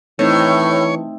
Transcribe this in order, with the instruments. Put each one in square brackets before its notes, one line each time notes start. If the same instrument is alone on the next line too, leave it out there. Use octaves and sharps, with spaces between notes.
[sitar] A2 [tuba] E3 [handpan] A3 C4 D#4 [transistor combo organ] C#5